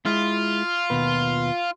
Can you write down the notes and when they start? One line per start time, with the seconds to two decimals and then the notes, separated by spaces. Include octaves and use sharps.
0.06 G#3 E4 F4
0.90 D#2 B2 B4